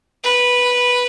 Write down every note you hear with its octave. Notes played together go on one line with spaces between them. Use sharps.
B4